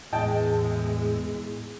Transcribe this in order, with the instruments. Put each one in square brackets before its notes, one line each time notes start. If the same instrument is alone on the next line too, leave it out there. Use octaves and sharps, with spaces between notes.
[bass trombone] E2 [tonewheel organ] A2 E4 [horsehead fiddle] G#3 [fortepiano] D#5 G5 A5